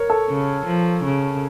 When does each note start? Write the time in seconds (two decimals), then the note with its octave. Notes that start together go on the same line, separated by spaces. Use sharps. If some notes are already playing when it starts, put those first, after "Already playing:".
Already playing: A#4 C#5
0.10 A4
0.29 C#3
0.66 F3
1.04 C#3